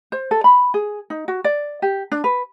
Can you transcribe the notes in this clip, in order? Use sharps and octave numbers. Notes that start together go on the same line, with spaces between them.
C5
A4
B5
G#4
D#4
F#4
D5
G4
D4
B4